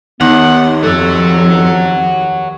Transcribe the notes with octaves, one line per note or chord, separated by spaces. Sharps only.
D#2 B3 F#5
F2 A4 C#5 F#5